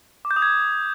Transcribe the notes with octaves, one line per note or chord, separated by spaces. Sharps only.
D6
G6
D#6
G#6